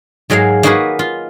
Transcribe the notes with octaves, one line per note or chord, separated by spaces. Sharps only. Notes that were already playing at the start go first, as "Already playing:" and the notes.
G#2 F#3 G#3 A#4 F5
A#3 D#4 F#4 G#4 A#4 B4
F4